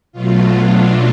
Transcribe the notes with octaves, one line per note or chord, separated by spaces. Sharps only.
B2 F#3 A3 F4
D4